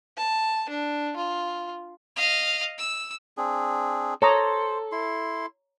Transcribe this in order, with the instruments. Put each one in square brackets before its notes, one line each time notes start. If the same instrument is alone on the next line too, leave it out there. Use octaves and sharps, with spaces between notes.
[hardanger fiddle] A5
D4
F4
[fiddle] D#5 F5
E6
[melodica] C4 D4 G#4
[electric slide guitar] A4 [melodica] C5 [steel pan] C#5 A#5 D#6
[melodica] E4 C6